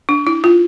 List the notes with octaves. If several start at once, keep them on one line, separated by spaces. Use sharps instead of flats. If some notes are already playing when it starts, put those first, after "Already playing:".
D4
E4
F4